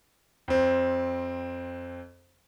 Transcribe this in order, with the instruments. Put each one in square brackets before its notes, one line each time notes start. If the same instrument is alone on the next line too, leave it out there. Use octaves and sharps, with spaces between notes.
[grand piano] F2 C4